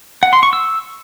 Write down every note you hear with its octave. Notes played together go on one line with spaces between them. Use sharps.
F#5
C6
C#6
E6